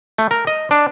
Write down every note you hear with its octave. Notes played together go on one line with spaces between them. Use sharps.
A3
A#4
D#5
D4